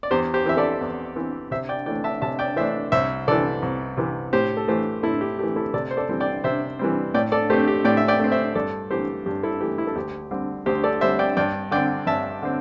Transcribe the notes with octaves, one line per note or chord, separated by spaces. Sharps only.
D5
E2 G4 C5
G4 C5
E3 C4 E5
A4 D5
E2
E3 C4
C3 C5 E5
D5 G5
E3 A3 D4 D5 G5
E5 A5
C3 E5 A5
D5 G5
E3 A3 D4 C5 E5
C2 C5 E5
C3 E3 A4 D5
C2
C3 E3
A2 G4 C5
A4
E3 A3 G4 C5
A2 E4 A4
G4
E3 A3 G4
E4 A4
C3 A4 D5
C5
A4 D5
E3 G3 C4
D5 G5
C3 C5 E5
E3 G3 C4
A2 D5 G5
A4 D5
A3 C4 G4 C5
G4
A2 D5 G5
E5
D5 G5
A3 C4
C5 E5
G2 A4 D5
E3 A3 G4 C5
G2 G4
E4 A4
E3 A3 G4
E4
A4
D2 G4
D3 G3 C4
D2 G4 C5
A4 D5
D3 G3 C4 C5 E5
D5 G5
G2 D5 G5
D3 C4 D5 G5
G2 E5 A5
D3 C4